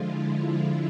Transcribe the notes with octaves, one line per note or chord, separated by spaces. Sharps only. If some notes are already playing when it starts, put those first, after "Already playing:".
Already playing: D3 F3 G#3 E4 F4